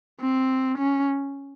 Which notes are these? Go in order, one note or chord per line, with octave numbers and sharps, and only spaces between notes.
C4
C#4